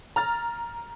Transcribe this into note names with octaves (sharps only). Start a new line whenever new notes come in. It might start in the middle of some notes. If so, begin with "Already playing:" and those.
A#5 F6 A6